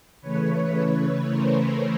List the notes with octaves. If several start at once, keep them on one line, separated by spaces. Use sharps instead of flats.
C#3 E3 A3 B4 C#5
B4 C#5
A#4 C5